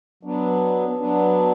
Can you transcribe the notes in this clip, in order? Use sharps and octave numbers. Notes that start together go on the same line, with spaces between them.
F#3 B3 D4
F#3 B3 D4